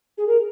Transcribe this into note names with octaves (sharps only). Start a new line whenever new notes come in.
G#4
A#4